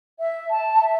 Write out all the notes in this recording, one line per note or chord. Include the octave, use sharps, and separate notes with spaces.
E5
A5
E5